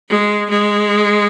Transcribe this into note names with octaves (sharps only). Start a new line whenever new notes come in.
G#3
G#3